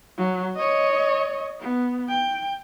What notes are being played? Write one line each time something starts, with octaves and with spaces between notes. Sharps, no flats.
F#3
C#5 D#5
B3
G5